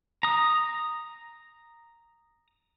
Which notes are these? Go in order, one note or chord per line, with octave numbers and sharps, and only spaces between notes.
A#5 D#6